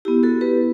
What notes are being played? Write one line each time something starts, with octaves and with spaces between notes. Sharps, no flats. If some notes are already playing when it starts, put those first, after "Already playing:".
B3 E4 G4
F#4 A4
G4 B4